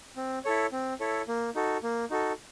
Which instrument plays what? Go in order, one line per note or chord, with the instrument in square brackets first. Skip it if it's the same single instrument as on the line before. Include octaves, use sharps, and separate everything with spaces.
[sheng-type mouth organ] C4
E4 A4 C#5
C4
E4 A4 C#5
A#3
D#4 F#4 A4
A#3
D#4 F#4 A4